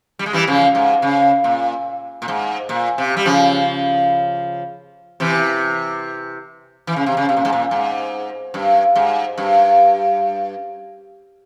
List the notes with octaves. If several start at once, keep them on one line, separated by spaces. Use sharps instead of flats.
G3
G#3
E3 G3
C#3 F3
G#2
C#3
A#2
A#2
G#2
A#2
C3
G3
C#3 F3
C3 E3
E3
C#3
C3
C#3
C3
A#2
G#2
A#2
G#2
G2
G#2
G2